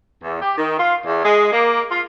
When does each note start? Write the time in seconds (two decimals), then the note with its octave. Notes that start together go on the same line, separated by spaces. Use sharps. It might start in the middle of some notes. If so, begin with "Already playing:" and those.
0.23 E2
0.41 G4
0.57 D#3
0.78 F4
1.05 E2
1.23 G#3
1.52 A#3
1.89 F4